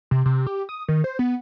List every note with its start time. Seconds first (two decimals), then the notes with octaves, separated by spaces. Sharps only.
0.11 C3
0.26 C3
0.47 G4
0.69 D#6
0.88 D#3
1.04 C5
1.19 B3